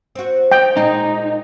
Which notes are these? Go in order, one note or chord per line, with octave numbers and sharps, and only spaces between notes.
C4 F#4
D#4 G5
A#2 G#3 D#4